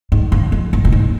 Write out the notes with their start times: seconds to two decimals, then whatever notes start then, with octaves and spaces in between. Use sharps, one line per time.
0.12 G#2
0.32 G2
0.52 F2
0.73 G2
0.85 A#2
0.92 G#2